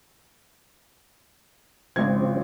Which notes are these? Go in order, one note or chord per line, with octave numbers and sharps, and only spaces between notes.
G#1 C#3 F3 C4 G#6